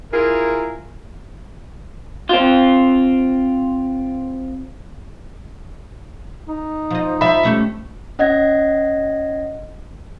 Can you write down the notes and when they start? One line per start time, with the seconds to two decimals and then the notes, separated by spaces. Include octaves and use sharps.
0.12 E4 F4 G#4 A#4
2.29 C4 F4
6.48 D#4
6.91 F3 D#5
7.21 F3 E5 B5
7.43 G3 A3 C#4
8.19 C#4 D#5 F#5 G#6 A#6